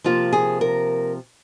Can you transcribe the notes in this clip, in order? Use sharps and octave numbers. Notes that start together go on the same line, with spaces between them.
C3 F3 A#3 F4
G#4
A#4